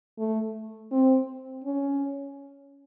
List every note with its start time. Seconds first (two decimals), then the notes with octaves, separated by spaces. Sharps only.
0.19 A3
0.92 C4
1.64 C#4